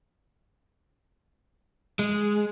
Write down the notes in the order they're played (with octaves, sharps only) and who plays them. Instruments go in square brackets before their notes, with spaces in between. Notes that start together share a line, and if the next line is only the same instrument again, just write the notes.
[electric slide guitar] G#3